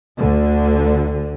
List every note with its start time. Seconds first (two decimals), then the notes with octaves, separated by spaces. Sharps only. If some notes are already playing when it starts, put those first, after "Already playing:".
0.17 D2 D3